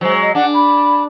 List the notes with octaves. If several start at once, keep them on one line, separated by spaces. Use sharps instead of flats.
F#3 G#3 C5
D#5
D4 F#5
B5